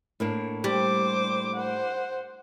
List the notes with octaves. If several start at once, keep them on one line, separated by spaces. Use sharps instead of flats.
A2 A#3 D4
G3 C5 D6
C5 F#5